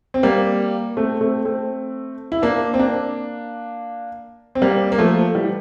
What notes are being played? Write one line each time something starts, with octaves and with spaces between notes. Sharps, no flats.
C4
G3 A#3
A3 C4
A3 C4
A3 C4
E4
A#3 D4
C4
A#3 D4
C4
G3 A#3
A#3
F3 A3
E3 G3